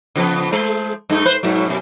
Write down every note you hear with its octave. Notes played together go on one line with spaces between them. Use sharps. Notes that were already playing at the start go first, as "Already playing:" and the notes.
C#3 F3 B3
G#3 A4 C5
G2 A3 D#4
G#2 B4 C5
G#2 B2 F#3
F#2 B2